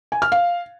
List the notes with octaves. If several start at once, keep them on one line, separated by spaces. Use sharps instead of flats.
G#5
F6
F5